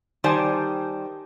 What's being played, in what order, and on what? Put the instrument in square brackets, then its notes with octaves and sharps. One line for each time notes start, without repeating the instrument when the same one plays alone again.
[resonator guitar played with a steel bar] D#3 G3 C5 D5 G#5 A5